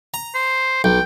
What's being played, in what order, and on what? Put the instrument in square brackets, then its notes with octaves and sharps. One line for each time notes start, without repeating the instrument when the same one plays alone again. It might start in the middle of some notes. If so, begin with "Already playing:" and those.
[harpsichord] A#5
[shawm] C5
[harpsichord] B1 [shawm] G5